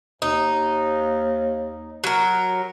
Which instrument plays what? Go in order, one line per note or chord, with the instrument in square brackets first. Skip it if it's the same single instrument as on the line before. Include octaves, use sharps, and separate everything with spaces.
[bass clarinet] D#2 [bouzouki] D#4
[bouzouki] F#3 A#4